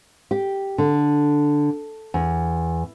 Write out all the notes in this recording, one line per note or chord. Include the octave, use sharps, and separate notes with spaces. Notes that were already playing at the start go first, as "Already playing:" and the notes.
G4
D3
E2